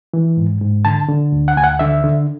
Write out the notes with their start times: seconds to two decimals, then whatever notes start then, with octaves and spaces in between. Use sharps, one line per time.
0.13 E3
0.37 G#2
0.61 G#2
0.85 D3 A5
1.09 D3
1.32 D2
1.48 F#5
1.57 D2 G#5
1.64 F#5
1.79 D3 E5
2.04 D3